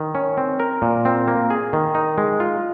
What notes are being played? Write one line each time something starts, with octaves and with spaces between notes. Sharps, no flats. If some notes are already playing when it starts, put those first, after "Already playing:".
Already playing: D#3
C#4
C4
A#4
A#2
C4
A#3
G#4
D#3
D#4
G#3
F4